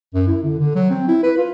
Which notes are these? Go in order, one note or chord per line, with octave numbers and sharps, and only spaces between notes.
F#2
E4
D3
D3
F#3
C4
E4
B4
F4